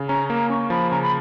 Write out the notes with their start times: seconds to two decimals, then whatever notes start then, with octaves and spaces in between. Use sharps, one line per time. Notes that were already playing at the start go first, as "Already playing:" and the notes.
Already playing: C#3
0.08 C#4 A#5
0.30 A#3 A#5
0.50 C#4 C#6
0.70 F3 B5
0.91 C#3 A#5
1.02 B5